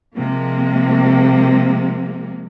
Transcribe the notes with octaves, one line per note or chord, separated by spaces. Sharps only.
C3 F3 G#3 A#3